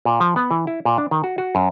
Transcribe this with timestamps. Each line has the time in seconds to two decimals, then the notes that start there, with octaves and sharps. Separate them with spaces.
0.05 A#2
0.20 F3
0.36 B3
0.51 E3
0.67 E4
0.85 A#2
0.98 D4
1.11 D#3
1.24 F#4
1.38 F#4
1.55 F#2